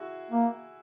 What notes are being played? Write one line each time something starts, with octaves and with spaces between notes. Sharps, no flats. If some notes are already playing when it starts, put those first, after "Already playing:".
Already playing: E4 F#4 G#4
A#3